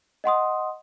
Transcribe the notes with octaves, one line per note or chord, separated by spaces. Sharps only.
D#5 F#5 C6 D#6